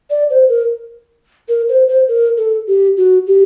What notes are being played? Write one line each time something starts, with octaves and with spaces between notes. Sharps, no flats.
D5
C5
A#4
A#4
C5
C5
A#4
A4
G4
F#4
G4